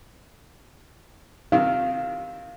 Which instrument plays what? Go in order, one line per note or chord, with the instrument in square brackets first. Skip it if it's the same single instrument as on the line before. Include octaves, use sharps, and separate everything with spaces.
[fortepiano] C3 D#3 [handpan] F5